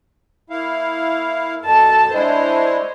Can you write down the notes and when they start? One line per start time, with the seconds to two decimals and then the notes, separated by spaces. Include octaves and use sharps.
0.50 A#3 E4 F5
1.63 F#2 B2 A4 A5
2.14 G#3 D4 E4 C5 C#5 D#5